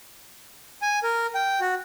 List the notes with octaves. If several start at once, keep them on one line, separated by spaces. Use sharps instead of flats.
G#5
A#4
G5
F#4